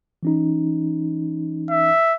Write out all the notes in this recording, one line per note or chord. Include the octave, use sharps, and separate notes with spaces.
E3 C#4 D#4
E5